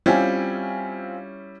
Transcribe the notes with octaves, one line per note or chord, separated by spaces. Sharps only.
G3 C4 C#4 E4 F4 G#5